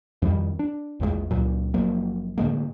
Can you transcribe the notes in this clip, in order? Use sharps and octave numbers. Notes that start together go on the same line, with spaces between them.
F2 D#3 G3
D4
A#1 E2 D3 G#3
C#2 A#2 F#3
F#1 F3 F#3 A#3
A2 D3 G#3 A#3